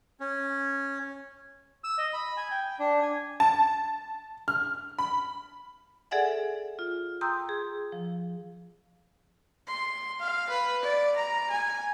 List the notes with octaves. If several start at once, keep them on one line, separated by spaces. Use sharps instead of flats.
C#4
E6
D#5
B5
G#5
G5
D4
G#5
A5
F6
B5
G#4 A4 D5 E5 F#5 G#5
F4
G5 A#5 C6 D#6 E6 G6
G#4
F3
C6
F5
B4
D5
A#5
G#5